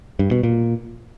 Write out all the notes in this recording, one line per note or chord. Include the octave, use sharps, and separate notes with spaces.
G2
B2
A#2